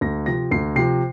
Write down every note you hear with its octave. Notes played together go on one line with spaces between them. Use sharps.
D2 A#6
C3 F3 A#6
D2 C7
C3 F3 C7